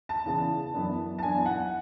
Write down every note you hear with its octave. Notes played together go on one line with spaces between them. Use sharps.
A5
E2 C#3 E3 B3 E4
F#2 E3 B3 D4
A5
F#2 E3 B3 D4 G#5
F#5